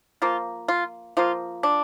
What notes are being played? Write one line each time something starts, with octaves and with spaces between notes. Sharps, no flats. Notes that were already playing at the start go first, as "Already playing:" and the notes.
F3 A#3 F4
F4
F3 A#3 F4
D4